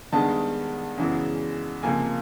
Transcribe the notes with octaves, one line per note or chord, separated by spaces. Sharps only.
G2 D#3 G#3 B3 A5
F#2 C#3 E3 G#3 B3
C#2 C3 F3 A#3 G#5